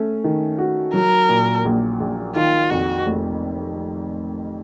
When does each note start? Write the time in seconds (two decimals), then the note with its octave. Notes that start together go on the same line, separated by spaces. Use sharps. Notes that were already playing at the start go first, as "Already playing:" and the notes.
Already playing: A3 C#4
0.24 D#3
0.58 F#4
0.94 F#3 A#4
1.29 A#2
1.65 A#1
2.00 A#1
2.36 D#3 F4
2.70 F2 F#4
3.06 F1